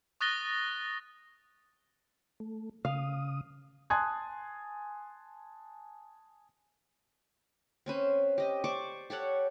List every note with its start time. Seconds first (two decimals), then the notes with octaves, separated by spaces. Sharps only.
0.21 C#6 D#6 F#6 A6 A#6 G7
2.40 A3
2.85 C#3 F5 D#6
3.90 G#5 A5 C6 D#6 F#6 G#6
7.86 C4 C#4 B4 C5
8.38 G4 D#5
8.64 C5 D5 C#6 D6
9.10 G4 A4 C#5 F#5